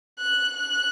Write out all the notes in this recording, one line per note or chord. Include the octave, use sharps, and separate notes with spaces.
F#6
F#6